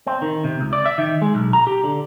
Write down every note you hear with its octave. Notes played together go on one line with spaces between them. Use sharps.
C4
D#3
C3
C#2
D5
E5
D#3
G#3
B1
A#5
G4
D3